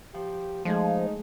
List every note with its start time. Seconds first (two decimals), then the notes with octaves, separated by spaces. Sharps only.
0.14 F3 G4
0.65 F3 G#3 A3 D#4 G#4